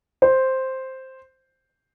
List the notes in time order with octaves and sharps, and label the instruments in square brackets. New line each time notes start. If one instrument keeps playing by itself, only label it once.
[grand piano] C5